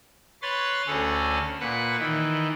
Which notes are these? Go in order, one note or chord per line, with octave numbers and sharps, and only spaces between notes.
B4 C#5 C6 A6
D2 C#4 G#4 A4
A#2 B4 F#5
D#3 E3